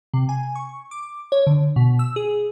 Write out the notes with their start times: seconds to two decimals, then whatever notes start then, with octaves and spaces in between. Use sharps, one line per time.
0.14 C3
0.29 G#5
0.55 C#6
0.91 D6
1.32 C#5
1.47 D3
1.76 B2
1.99 E6
2.16 G#4